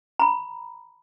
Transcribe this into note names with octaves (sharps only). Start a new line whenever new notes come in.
A#5 B5